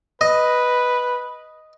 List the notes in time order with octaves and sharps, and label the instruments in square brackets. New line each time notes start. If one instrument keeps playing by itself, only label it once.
[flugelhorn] B4 [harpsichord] D#5